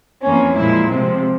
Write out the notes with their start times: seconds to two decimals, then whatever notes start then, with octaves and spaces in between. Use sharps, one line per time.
0.23 F2 E3 A#3 C#4
0.56 A#2 F3 G#3 E4
0.90 C3 F3 G#3 C4